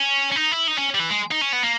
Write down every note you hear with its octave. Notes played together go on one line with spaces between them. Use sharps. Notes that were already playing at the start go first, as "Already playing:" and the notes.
Already playing: C#4
C#4
D#4
E4
D#4
C#4
G3
E3
G#3
D#4
C#4
B3
A#3